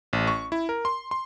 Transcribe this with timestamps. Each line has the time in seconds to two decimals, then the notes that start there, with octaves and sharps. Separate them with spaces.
0.13 A1
0.27 C#6
0.52 E4
0.69 A#4
0.85 C6
1.11 C6